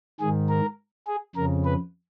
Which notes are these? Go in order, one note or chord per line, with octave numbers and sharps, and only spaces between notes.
G#2 D#3 G#4
A#4
G#4
F2 C#3 A#4
B4